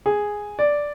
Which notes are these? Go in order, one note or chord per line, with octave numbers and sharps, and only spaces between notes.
G#4
D5